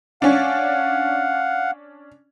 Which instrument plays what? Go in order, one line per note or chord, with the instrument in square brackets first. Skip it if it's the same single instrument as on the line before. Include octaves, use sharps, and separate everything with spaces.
[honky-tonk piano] C#4 D4 [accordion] F5 F#5